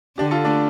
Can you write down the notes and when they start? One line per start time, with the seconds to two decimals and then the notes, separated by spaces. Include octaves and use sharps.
0.18 D3 D4 G4
0.31 F4 A4
0.45 A3 D4